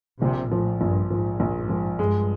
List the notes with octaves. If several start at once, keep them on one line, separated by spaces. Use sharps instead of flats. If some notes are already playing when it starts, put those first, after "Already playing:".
A#1 C3
A2 F3
A#1 G2
G#2 F3
A#1
G#2
F3
G2 G#3